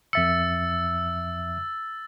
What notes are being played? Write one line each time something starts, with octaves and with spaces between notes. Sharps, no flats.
F2 E5 E6 A6 C#7